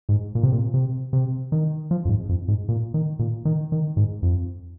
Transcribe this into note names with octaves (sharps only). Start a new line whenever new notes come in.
G#2
A#2
C3
A#2
C3
C3
D#3
F3
F2
G#2
F2
G#2
A#2
D#3
A#2
D#3
D#3
G#2
F2